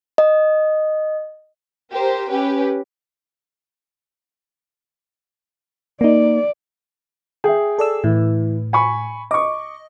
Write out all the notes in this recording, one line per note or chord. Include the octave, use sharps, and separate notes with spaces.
D#5
G4 A#4 C5
C#4 G4 B4
A#3 D#4 D5
G#4 E5 G5
A4 D5 E6
A2 E3
G#5 B5 C#6
D#5 C#6 D6